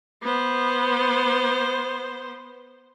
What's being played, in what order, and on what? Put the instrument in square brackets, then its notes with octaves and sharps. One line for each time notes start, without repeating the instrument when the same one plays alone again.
[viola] B3 C5